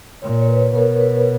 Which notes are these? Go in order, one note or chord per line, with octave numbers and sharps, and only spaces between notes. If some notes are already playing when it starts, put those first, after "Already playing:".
A#2 C#5
C#5
B4
B2 A#4
B4